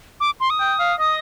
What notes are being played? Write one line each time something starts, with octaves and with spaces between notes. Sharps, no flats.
D6
C6
D#6
G5
F5
D#5 D#6